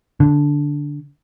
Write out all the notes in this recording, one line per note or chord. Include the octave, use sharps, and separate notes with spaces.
D3